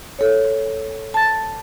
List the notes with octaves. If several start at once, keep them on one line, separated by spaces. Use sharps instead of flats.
A4 C#5
A5 A6